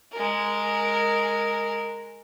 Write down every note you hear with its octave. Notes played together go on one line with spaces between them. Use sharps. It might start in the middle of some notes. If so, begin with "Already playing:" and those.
G#3 A#4